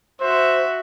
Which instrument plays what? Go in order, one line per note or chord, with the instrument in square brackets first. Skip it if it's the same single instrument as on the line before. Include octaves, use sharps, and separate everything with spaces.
[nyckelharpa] F#4 E5 [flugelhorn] C5